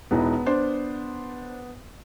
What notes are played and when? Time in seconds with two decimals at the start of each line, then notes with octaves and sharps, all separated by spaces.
0.11 E1 E3 B3 D#4
0.46 D4 C5